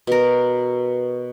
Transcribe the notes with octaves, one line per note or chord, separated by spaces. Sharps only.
B2 A#4